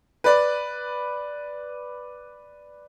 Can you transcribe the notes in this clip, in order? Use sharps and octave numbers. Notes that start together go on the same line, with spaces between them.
B4 D5